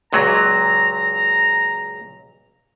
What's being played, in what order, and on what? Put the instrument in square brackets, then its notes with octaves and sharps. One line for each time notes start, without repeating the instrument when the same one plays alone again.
[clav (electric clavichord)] C#2 A#2 F#3 [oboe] A#5